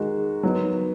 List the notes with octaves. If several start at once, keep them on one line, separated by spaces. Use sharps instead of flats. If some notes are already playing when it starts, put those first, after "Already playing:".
Already playing: D#3 G#3 D#4 F#4
F#3 B3 D#4